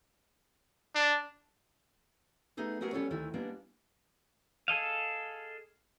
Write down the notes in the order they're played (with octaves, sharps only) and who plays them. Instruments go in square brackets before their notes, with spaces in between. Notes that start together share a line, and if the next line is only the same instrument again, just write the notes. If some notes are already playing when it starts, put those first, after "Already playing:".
[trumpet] D4
[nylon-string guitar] A3 B3 D#4 G#4 A4
G#3 A3 B3 F#4 G#4 A#4
G3 B3 C#4 F4 A4 C#5
D2 D#3 E4 A4
G3 G#3 A#3 B3 D4
[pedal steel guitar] G#4 A4 D#5 F5